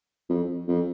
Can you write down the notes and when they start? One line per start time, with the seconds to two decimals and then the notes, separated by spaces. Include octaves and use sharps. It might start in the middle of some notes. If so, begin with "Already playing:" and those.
0.29 F2
0.68 F2